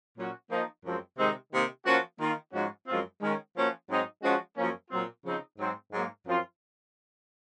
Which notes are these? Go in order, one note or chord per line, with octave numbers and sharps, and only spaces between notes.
A#2 F#3 C#4 F#4
F3 A#3 D#4
F#2 F3 G#3 C4
C3 D#3 G#3 C4 D#4
C3 D#3 A#3 D#4
F3 A#3 C#4 F#4
D#3 A#3 F4
G#2 F3 G#3 C#4 F#4
F#2 F3 G#3 C4 F4
D#3 G#3 C#4
F3 A#3 C#4 F#4
G#2 F#3 C4 D#4
F3 G#3 C#4 F#4
F#2 F3 A#3 C#4
A#2 F#3 C4 F4
C#3 F3 C4 D#4
G#2 F#3 C4
G#2 F#3 A#3
F#2 F3 C4 F4